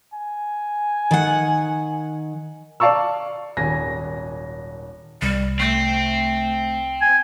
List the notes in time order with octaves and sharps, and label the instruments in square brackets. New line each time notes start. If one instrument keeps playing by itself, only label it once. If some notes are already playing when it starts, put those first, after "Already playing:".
[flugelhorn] G#5
[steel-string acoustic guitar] D#3 F#5
[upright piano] D5 F5 A5 C#6 E6
D#1 G#1 G#5 A#6
[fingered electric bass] C2 [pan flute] G3
[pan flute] A3 [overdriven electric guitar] C4
[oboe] G#5